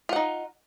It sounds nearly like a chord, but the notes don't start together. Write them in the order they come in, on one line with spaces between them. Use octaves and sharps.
F4 F#5 D#4